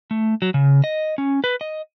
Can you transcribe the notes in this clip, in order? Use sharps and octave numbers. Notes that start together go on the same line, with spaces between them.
A3
F#3
C#3
D#5
C#4
B4
D#5